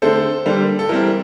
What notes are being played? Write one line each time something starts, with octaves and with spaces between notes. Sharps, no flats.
D3 A3 C4 A4 C5
D3 G3 A#3
A4
E3 G3 C4 A#4